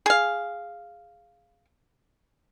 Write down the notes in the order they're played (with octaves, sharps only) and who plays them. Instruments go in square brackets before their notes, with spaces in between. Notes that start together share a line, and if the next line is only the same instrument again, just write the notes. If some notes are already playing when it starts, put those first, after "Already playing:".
[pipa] G#4 F5